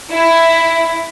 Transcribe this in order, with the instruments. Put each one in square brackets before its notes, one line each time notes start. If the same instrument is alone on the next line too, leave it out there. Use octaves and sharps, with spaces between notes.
[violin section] E4